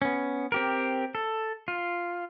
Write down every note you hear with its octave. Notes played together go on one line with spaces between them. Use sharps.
B3 C#4
C4 G4 A#4
A4
F4